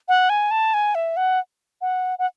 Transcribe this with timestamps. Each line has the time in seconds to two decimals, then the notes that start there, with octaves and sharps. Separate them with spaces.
0.08 F#5
0.29 G#5
0.51 A5
0.74 G#5
0.95 E5
1.17 F#5
1.81 F#5
2.19 F#5